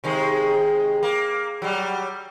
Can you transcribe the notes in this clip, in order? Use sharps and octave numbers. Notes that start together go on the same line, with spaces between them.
C3 D#3 G#3
A#3
F#3 G3